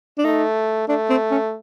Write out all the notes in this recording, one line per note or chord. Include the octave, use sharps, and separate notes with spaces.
D4
A3 D#4
A3 D4
C4
C#4